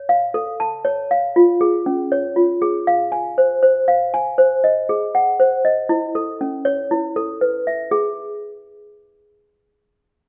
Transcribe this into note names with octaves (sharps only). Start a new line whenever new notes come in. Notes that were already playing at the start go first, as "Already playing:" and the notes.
Already playing: C#5
F5
A4
A5
C#5
F5
F4
G#4
C#4
C#5
F4
G#4
F5
G#5
C5
C5
F5
G#5
C5
D#5
G#4
F#5
C5
D#5
E4
A4
C#4
C#5
E4
A4
B4
E5
G#4